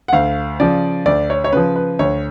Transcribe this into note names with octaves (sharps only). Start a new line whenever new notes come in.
F#5
D2 F5
C#3 F3 D5
D2 D5
C#5
C#5
C#3 F3 B4
B4
D2 C#5